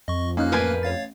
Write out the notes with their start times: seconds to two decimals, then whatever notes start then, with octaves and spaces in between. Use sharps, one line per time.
0.08 F2 D#5 C#6
0.37 A#3 C#4 D#4 F4 F6 F#6
0.52 A1 A#4 B4 G#5 G6 C7
0.83 C#5 F5 A6